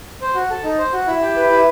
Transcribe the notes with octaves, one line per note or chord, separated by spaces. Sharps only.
C5
F#4
A4
D#4
C5
F#4
E4
G4
B4
E4